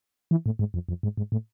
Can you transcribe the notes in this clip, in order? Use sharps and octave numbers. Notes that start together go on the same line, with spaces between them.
E3
A2
G#2
F2
F2
G#2
G#2
A2